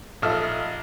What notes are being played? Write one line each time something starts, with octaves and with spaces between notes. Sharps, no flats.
A#1 D#4 A4 E5 F6